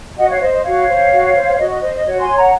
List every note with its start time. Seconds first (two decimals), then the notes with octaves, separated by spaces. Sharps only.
0.17 F#4 D#5 F#5
0.29 C#5 F5
0.41 C5 D#5
0.52 D#5
0.64 F#4 C#5 F5
0.88 C5
1.12 F#4
1.34 C5
1.58 F#4 D#5
1.70 D#5
1.81 C5 D#5
1.94 D#5
2.05 F#4 C#5
2.21 G#5 C6
2.30 C#5
2.37 F#5 A#5